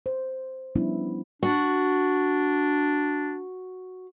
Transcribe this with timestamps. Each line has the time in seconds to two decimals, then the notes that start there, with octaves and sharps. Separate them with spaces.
0.06 C5
0.75 F3 G3 B3 C#4 D4 E4
1.43 D4 F#4